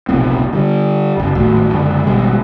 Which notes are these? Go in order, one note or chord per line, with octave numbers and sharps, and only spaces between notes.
F1 B1 A#2 C4
D3 G3
F#1 F#2
G#1 D#2 A2 F#3
F#1 D3 G#3
G#1 B2 G3 G#3